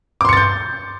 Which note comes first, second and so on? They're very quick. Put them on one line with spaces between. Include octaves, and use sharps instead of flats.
D6 C6 C#7 A6 G6